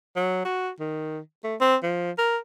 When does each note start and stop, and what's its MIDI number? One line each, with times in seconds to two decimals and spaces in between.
0.16 0.43 54
0.45 0.70 66
0.80 1.19 51
1.44 1.56 57
1.61 1.76 60
1.83 2.11 53
2.18 2.37 70